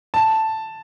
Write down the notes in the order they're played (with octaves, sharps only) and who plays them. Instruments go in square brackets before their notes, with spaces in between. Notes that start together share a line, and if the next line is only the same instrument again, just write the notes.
[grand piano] A5